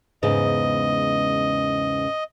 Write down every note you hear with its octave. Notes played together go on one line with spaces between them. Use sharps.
E2 G#2 C#3 D#5